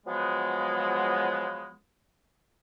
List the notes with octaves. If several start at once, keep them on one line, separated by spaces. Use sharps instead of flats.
F3 F#3 G#3 B3